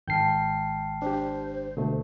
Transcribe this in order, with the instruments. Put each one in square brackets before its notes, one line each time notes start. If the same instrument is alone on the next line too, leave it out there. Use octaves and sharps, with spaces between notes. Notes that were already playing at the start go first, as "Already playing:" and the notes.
[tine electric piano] G#1 C7 [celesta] G5 A5 F6 [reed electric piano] G6
[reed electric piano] D4 G4 [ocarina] C5
[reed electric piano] B2 D3 A3 [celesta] A#4